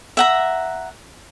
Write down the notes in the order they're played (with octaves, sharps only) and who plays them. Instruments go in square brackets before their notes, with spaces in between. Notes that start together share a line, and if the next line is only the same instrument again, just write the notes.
[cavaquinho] E5 F#5 A#5